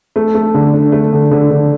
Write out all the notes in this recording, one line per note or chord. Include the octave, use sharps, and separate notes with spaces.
A3
A3
D3
D4
A3
D3
D3
D3